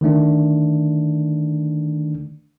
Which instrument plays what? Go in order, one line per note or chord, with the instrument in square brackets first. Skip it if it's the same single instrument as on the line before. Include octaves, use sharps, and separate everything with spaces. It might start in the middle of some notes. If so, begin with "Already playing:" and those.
[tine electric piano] D3 D#3 A3 D4